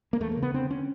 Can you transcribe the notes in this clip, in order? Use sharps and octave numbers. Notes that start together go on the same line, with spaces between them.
A#3
E2 A3
A#3
C#3
B3
D3 C4
C#4